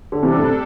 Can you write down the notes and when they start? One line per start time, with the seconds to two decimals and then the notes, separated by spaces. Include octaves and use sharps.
0.12 D3
0.22 C3 E3 G3 D4 A4
0.37 A2 C3